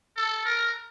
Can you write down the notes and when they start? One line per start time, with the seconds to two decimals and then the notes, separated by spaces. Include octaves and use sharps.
0.17 A4
0.45 A#4